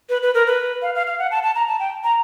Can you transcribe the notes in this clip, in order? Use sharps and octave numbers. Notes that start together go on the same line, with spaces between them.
B4
B4
A#4
B4
F5
F5
F5
F#5
A5
A5
A#5
A5
G5
A#5